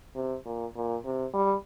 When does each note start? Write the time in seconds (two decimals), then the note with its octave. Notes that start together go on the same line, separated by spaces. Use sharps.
0.15 C3
0.45 A#2
0.75 A#2
1.05 C3
1.34 G3